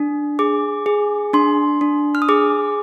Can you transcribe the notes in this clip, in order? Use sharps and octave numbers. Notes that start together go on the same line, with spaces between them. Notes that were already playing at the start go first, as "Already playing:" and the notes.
Already playing: D4
G#4 D6
G#4
D4 C6
D4
F6
D#6
G#4 D6